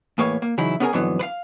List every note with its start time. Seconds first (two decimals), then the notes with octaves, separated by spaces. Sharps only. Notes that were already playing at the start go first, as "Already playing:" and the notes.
0.18 E2 A2 A#3 B4 C#5
0.42 A#3
0.58 C#3 E3 F#3 D#4 E4
0.80 B3 C#4 F4 G#4 A#4 G#5
0.93 F2 G#2 D3 E3 F#3 B3
1.19 B4 F5